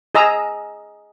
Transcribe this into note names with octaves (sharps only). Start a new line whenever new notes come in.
G#4 D#5 A#5 E6